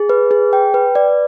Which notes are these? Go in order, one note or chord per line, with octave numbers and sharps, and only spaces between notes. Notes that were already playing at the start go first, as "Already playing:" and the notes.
Already playing: G#4
B4
G#4
G5
B4
D5